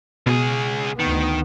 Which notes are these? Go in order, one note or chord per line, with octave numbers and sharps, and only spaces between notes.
C#2 B2 G#4
D2 D#3 B3